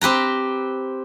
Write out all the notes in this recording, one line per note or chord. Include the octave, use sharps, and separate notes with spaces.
C4 G4 B4 A#5